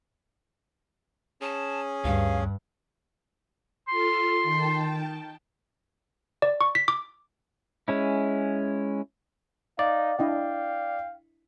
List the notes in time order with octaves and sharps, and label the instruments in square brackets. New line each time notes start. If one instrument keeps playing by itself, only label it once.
[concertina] C#4 G#4 [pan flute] A5
[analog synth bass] D2 [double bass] G2 [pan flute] F5
[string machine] F4 A4 [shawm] C6
[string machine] D#3 G5 A5
[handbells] D5
C#6
B6
D6
[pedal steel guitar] G#3 C#4 E4
[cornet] D#4 [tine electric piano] D5 [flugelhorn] F5
[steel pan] D4 E4 D#5 [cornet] F5 [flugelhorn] G5